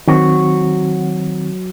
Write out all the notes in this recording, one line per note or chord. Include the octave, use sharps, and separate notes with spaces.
D#3 F#3 C4 F#4